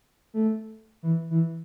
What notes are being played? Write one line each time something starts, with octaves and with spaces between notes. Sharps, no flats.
A3
E3
E3